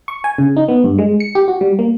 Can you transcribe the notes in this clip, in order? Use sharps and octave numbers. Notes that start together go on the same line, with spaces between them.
C#6
G#5
C#3
D#4
B3
G2
G#3
C#7
G4
F#4
G3
A#3